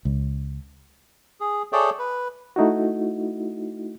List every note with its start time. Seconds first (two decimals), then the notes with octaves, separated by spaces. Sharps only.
0.05 C#2
1.40 G#4
1.72 G#4 A4 C#5 D5 E5 G5
1.99 B4
2.56 A3 D#4 E4 F#4